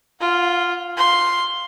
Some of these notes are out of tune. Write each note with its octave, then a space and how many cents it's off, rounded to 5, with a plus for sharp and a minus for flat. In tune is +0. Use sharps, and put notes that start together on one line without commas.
F4 +0 F#5 -35
F5 +0 C6 +0